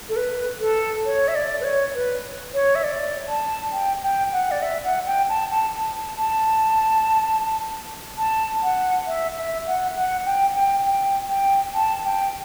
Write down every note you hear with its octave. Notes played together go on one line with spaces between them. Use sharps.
A4
B4
A4
C#5
E5
D5
B4
C#5
B4
C#5
E5
D5
A5
G5
G5
F#5
D5
E5
F#5
G5
A5
A5
A5
A5
A5
F#5
E5
E5
F#5
F#5
G5
G5
G5
G5
A5
G5